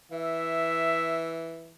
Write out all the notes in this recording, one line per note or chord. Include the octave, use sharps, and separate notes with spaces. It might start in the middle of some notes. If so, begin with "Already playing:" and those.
E3 E5